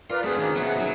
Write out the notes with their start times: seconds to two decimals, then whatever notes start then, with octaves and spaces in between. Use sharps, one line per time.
0.10 F4 A#4 B4 D5 F5
0.24 F#3 A3 C4 D4 G#4 D#6
0.39 D#3 F3 A#3 C#4
0.56 A#3 B3 F#4 B4 C5 E5
0.79 F#3 C#4 D#4